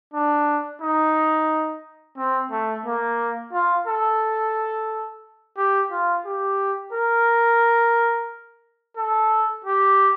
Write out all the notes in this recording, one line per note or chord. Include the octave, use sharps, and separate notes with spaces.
D4
D#4
C4
A3
A#3
F4
A4
G4
F4
G4
A#4
A4
G4